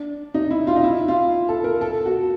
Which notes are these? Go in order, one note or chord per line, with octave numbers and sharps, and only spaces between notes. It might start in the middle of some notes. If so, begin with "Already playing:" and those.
Already playing: D4
D#4
E4
F4
D#4
E4
F4
A4
A#4
A4
F#4